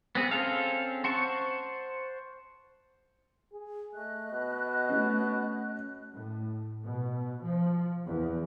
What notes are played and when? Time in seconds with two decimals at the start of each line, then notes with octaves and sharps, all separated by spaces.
0.15 B3 C4 G#4
0.31 C4 C#4 G#4 A4 F5
1.04 C5 F#5 A5 C#6
3.53 G#4
3.95 A3 D#5 F#6
4.31 B2
4.89 A3 C#4
6.13 A2
6.84 B2
7.42 F3
8.07 E2